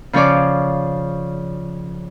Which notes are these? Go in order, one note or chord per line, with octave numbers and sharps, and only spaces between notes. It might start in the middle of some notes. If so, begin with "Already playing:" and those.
C#3 F3 C#4 C#5 D5 D6